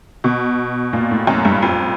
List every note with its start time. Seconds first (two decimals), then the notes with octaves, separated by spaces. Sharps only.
0.24 B2
0.93 A#2
1.11 A2
1.27 F#2
1.45 G2
1.62 F2